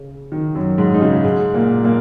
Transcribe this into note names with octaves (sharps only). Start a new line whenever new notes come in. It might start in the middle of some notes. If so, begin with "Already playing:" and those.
Already playing: C#3
D#3
F#2 F#3
G#2 G#3
D#4
C#3 C#4
G#2 G#3
A#2 A#3
A#2 A#3